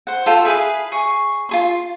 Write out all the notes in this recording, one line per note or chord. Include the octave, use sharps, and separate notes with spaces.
C5 F#5
F4 A4 G5
E4 G#4 B4 F5
G#4 C#6
F4 G#4 C6